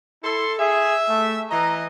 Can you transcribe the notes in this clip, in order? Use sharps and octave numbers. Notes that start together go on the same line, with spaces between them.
E4 A4 C6
G#4 E5
A3
E3 D#5 A#5